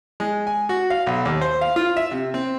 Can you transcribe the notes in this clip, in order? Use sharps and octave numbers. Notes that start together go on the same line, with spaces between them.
G#3
G#5
F#4
F5
B1
D#2
C5
F5
F4
E5
C3
C4